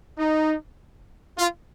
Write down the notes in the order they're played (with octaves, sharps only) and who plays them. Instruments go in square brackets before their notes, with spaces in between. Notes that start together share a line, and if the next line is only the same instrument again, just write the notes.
[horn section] D#4
F4